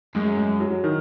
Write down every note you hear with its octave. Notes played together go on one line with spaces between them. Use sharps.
F#2 G#3
G#3
F#3
D#3